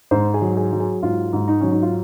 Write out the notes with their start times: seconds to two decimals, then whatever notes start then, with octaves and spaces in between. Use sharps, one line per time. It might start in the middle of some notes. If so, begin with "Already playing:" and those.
0.11 G#2 C5
0.34 G#4
0.42 F#3
0.57 G#4
0.73 F#3
0.80 G#4
1.03 G#2 F4
1.33 G#2
1.48 D#4
1.60 F#3 C#4
1.71 D#4
1.83 F4